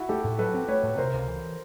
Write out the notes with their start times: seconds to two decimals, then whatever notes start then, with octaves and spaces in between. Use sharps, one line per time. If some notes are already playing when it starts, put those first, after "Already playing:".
Already playing: E4 F#4
0.09 A3 G4 A4
0.24 A2
0.38 F#3 A4 B4
0.54 C4
0.68 A3 B4 C#5
0.83 A2
0.98 C3 A#4 C5
1.13 C#2
1.28 E3